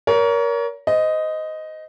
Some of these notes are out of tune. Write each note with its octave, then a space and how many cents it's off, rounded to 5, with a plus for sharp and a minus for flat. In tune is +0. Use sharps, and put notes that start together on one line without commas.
A#4 +15 C#5 +35
C5 -35 D#5 +5